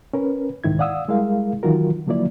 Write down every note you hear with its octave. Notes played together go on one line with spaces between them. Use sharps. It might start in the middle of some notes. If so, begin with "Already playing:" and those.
C#4 A#4 B4
C2 G#2 D#3 E4 G#6
D5 F5 F#5 D#6 E6
G3 G#3 E4 G#4 A#4 F5
D#3 E3 F#3 F4 F#4 A#4
D3 F3 F#3 A#3 E4 D5